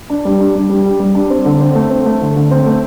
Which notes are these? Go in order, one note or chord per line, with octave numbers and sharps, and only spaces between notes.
D4
G3
D4
G3
G3
G4
G3
D4
C4
D3
C4
A3
C4
A3
D3
D3
C4
A3